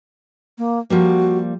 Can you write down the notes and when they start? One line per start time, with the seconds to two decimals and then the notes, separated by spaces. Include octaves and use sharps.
0.58 A#3
0.90 F3 G3 A#3 F#4